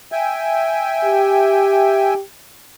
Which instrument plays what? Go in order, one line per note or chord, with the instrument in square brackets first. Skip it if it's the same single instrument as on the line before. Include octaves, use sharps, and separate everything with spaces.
[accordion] E5 G5 G#5
[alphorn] G4